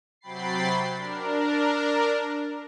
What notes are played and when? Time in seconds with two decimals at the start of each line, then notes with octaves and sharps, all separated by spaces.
0.21 C3 F#3 G5 B5 A6 C7
0.95 D4 A#4